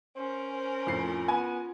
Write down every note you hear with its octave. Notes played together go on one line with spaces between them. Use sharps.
C#4 A#4 C5
C5
F2 A2 F4 C7
B3 G#5